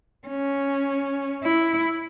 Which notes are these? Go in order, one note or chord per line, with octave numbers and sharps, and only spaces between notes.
C#4
E4